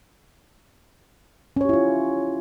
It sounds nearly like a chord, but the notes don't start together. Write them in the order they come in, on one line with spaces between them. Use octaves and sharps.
C#4 C#5 G4 E4 F4